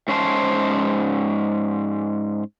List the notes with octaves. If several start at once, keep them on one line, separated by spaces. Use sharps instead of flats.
G#2 C#4 C5 A5